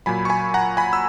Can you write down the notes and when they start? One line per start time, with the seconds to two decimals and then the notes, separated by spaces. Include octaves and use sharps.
0.06 A#2 F#3 G#5 B5
0.25 C#6
0.29 G#5 B5
0.54 F#5 A#5
0.77 G#5 B5
0.93 E6